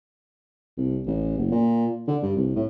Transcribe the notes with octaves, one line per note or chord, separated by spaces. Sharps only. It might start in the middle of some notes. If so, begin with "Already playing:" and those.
C2
A1
F#1
A#2
D3
G2
C2
A2